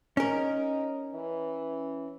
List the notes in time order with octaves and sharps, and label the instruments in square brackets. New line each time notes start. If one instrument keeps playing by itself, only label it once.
[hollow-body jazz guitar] C#4 A#4 [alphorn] D#4
[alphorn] E3